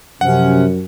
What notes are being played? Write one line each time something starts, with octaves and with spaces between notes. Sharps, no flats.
F#2 C3 F3 C#4 F#5